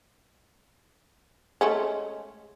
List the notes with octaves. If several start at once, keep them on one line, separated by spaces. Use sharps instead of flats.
G#3 A3 C#4